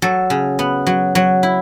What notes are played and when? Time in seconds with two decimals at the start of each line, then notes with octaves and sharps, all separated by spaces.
0.02 F#3 A4
0.30 C#3
0.59 B3
0.87 F#3
1.15 F#3
1.43 E4